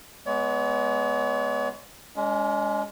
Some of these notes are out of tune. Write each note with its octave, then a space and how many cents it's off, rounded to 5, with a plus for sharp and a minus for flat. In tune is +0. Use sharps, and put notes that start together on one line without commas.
G#3 +20 B3 +5 C#5 +45
G#3 +0 C#4 +45